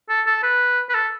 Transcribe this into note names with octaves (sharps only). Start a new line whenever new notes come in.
A4
A4
B4
B4
A4